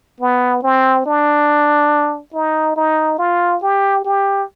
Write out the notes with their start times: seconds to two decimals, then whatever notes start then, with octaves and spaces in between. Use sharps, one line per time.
0.20 B3
0.63 C4
1.06 D4
2.34 D#4
2.76 D#4
3.19 F4
3.63 G4
4.05 G4